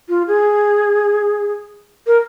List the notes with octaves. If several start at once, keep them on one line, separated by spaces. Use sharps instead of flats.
F4
G#4
A#4